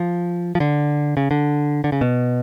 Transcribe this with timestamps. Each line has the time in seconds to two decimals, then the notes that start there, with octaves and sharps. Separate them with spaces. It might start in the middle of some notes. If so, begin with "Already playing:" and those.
Already playing: F3
0.55 F3
0.60 D3
1.17 C#3
1.31 D3
1.84 D3
1.92 C#3
2.01 B2